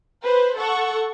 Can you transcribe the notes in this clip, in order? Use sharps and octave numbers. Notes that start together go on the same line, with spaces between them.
B4 C5
A4 F#5 C#6